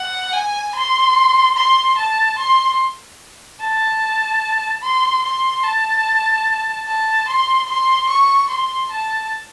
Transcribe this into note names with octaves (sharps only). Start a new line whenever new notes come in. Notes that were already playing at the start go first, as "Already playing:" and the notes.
Already playing: F#5
G#5
C6
C6
A5
C6
A5
C6
C6
A5
A5
C6
C6
C#6
C6
A5